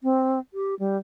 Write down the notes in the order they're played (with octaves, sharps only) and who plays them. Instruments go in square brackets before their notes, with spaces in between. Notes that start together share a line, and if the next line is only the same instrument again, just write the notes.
[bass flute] C4
G4
G3